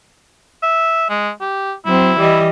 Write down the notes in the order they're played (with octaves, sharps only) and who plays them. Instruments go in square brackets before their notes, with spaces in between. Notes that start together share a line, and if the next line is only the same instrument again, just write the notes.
[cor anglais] E5
G#3
G4
[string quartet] F#3 C4 [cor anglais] E4
[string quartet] E3 G3 D#5